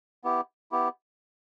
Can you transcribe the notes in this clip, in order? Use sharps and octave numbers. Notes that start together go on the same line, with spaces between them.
B3 E4 G4
B3 E4 G4